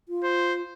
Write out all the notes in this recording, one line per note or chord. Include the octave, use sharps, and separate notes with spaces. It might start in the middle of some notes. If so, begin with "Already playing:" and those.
F4
C5